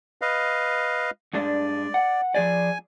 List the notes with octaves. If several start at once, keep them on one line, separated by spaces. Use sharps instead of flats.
B4 D#5 F5
G2 G#3 D4 D5
F#5
F3 G#4 D5 G#5